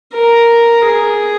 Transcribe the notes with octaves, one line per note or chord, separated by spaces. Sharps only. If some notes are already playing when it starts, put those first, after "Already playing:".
A#4
G#4